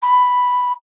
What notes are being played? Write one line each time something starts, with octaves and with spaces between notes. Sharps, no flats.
B5